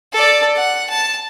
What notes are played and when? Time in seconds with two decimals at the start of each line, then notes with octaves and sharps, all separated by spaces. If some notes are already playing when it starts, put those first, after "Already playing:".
0.14 A4 D5
0.56 F#5
0.89 A5